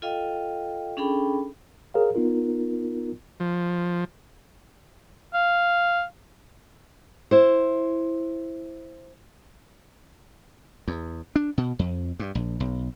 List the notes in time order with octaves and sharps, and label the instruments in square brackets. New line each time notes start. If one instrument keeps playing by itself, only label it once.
[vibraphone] F4 A4 D#5 F5 G5
C#4 D4 G#4 A4 G5 B5
[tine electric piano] G#4 A#4 C#5 F5
B3 D#4 F4 A#4
[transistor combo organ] F3
[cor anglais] F5
[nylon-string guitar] E4 C5
[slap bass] E2
D4
B2
F2
G2
A#1
B1